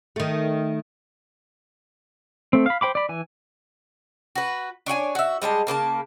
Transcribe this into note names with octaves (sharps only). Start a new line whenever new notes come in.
D#3 A3
A3 C4
F5 B5
C5 G5 B5 D6
D5 B5
E3 G#5
F#4 B4
D4 C#5 F#5 G#5
F#4 E5
G3 G#3 G#5 A5
C#3 A#3 B4 A5